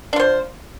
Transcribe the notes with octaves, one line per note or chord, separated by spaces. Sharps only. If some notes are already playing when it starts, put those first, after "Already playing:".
D4 F4 C5